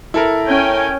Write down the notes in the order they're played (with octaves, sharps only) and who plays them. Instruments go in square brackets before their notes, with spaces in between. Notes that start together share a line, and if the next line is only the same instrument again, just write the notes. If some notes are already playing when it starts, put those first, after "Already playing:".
[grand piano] E4 A4 A#4
[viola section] C#4 G5 G#5